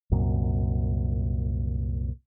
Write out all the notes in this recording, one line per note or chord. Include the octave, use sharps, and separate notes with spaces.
C2 F#2 A#2